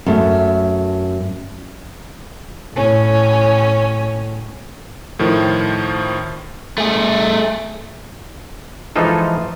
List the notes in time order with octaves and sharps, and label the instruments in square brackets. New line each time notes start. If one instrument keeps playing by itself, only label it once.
[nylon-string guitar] F#2 A3
[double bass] A2 [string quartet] C#4
[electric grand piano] A2 D#3 F3
[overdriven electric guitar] A3 G#4
[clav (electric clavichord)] E3 F3 G#3 D#4 F4 A4